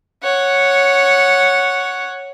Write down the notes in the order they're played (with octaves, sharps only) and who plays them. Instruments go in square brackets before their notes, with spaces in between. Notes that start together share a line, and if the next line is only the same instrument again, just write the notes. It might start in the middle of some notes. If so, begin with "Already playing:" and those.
[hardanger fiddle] C#5 F#5